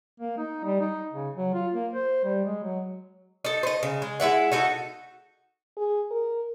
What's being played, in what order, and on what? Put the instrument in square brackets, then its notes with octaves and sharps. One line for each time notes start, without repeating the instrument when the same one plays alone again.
[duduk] A#3
D#4
G3
D#4
C#3
F#3
F4
A#3
C5
G3
G#3
F#3
[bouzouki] D#4 A4
C5 D#5
C#3
G#3
G#3 E4 E5 F#5
D#4 F#4 A4 D#5
[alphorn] G#4
A#4